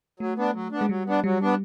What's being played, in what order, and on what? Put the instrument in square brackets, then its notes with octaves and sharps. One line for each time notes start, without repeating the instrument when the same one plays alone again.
[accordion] F#3 [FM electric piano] A3
[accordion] B3 D4
F#3
B3 D4
[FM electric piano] G#3
[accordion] F#3 [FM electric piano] G3
[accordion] B3 D4
[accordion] F#3 [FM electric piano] G3
[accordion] B3 D4